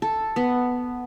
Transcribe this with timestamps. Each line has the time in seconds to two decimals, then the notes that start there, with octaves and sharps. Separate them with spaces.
0.02 A4
0.36 B3